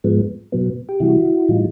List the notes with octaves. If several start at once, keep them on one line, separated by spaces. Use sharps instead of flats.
G#2 F3 G#3 B3
B2 F#3 B3
G4
C3 E3 G3 E4 F#4
A2 E3 G3 D#4 F4